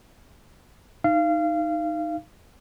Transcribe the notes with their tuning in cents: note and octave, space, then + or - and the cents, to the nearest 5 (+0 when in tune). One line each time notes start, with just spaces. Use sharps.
D#4 +0 F5 -25